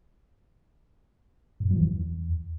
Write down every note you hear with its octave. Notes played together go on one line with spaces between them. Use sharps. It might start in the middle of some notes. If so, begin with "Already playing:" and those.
G#2
G2
F#3
E3
E2